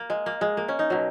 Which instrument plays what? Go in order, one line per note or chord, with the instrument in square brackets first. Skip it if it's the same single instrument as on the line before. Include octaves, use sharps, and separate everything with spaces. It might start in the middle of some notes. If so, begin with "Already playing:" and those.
Already playing: [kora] A#3
G#3
A#3
G#3
A#3
C#4
D#4
B2 F#3